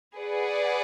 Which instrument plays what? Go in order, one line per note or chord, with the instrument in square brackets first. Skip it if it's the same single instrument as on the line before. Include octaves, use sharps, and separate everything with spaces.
[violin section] G#4 B4 D5 F#5